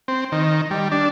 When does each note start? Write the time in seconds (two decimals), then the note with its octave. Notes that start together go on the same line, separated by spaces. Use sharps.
0.08 C4
0.32 D#3
0.71 G3
0.92 D4